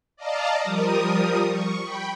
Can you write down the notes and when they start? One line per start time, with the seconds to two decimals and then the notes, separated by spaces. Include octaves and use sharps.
0.16 D5 D#5 F5 A5 A#5
0.63 F3 G3 A#4 D#6
1.47 C#6
1.81 G5 B5